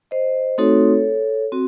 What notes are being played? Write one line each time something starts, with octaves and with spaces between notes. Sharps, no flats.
C5 D#5
A3 C4 D#4 F#4 A4 C#5
C4 F#4